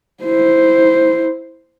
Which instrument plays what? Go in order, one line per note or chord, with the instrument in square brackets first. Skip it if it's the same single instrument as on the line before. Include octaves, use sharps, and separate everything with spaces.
[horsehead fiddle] E4 C5